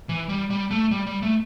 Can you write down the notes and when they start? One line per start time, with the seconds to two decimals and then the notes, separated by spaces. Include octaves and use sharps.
0.09 E3
0.29 G3
0.50 G3
0.71 A3
0.91 G3
1.07 G3
1.23 A3